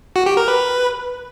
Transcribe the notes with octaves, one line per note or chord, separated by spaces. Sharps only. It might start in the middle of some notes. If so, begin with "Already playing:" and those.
F#4
G4
A#4
B4